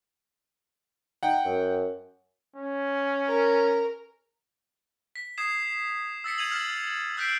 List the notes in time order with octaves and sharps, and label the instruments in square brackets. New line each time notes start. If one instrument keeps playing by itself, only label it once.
[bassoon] D#4 [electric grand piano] F#5 G5
[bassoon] F#2
[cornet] C#4
[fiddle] A#4
[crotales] B6
D#6 G#6 C7 E7
E6 A6 B6 C#7
G#6 D#7 F7 F#7
E6 F6 A6 B6 E7
E6 F#6 G6 B6 C7 D7